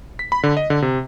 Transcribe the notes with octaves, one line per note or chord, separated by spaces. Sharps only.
B6
B5
D3
D#5
D3
C3